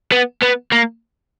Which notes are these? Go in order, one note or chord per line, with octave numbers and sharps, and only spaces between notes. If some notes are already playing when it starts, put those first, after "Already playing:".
B3
B3
A#3